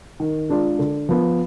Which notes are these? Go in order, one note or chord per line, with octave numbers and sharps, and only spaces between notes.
D#3
G#3 D4 F4
D3
F3 B3